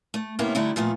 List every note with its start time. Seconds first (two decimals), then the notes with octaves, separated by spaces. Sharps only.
0.14 A3
0.39 A2 C3 A#3 B3 C#4 E4
0.55 D3 G3 A3 D#4 E4
0.76 A#2 F3 A3 B3